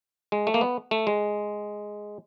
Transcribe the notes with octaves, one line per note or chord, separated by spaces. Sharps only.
G#3
A3
A#3
B3
A3
G#3